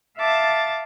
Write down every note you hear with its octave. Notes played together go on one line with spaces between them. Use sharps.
E5 F5 A5 D6 A6